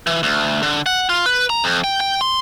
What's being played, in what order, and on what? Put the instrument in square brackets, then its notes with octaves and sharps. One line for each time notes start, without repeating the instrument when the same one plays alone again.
[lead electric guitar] E3
D2
D3
F#5
F4
B4
A#5
F2
G5
G5
C6